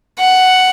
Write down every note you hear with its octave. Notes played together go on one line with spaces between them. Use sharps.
F#5